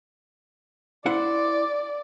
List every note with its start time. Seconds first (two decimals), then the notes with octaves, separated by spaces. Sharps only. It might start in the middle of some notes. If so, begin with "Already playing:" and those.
1.06 E4 C5 D5 F#5